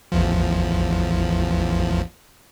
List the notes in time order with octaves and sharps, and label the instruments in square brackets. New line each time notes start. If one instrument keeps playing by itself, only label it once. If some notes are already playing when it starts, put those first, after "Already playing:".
[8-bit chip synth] A1 E2 F3